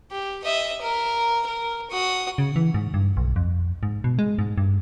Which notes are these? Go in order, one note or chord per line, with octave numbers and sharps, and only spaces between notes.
G4
D#5 E5
A#4
A#4
F#4 D#6
C#3
E3
G#2
G2
B1
F2
G#2
B2
G#3
G#2
G2